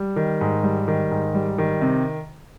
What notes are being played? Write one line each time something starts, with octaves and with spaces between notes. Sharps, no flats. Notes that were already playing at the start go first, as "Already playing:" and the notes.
Already playing: G3
D#3
G#2
G3
D#3
G#2
G3
D#3
C3